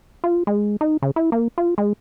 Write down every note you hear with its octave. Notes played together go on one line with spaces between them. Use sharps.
F4
G#3
D#4
C#3
E4
A#3
F4
G#3